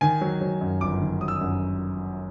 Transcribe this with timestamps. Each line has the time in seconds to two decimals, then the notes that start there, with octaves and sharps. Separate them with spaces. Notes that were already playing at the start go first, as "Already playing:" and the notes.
0.01 D#3 G#5
0.21 F#3
0.41 F#3
0.61 F#2
0.81 G1 D6
1.01 D#3
1.21 F#3 D#6
1.28 E6
1.35 D#6
1.41 F#2